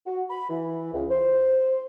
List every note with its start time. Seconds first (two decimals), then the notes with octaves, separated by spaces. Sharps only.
0.06 F#4
0.30 B5
0.50 E3
0.93 C#2
1.11 C5